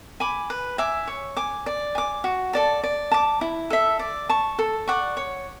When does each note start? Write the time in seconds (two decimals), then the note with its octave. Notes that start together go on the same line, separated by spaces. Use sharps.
0.20 G#5 B5 D6
0.50 B4
0.78 E5 G#5 D6
1.07 C#5
1.37 G#5 D6
1.66 D5
1.95 G#5 D6
2.24 F#4
2.53 A4 D5 A5
2.83 D5
3.11 A5 D6
3.41 E4
3.70 A4 E5
3.99 D5
4.29 A5 C#6
4.59 A4
4.88 D5 F#5 C#6
5.17 C#5